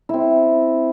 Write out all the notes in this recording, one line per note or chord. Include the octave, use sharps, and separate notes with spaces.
C4 E4